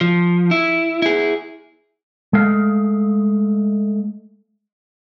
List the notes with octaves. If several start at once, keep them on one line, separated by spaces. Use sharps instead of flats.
F3
E4
E4 G#4
G#3 A3 F5